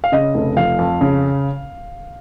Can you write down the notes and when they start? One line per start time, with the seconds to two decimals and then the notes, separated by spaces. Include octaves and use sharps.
0.04 F5
0.12 C#3 D#5
0.35 F1
0.56 F3 F5
0.79 F2
1.01 C#3